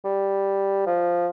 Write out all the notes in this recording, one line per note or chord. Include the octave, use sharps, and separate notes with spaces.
G3
F3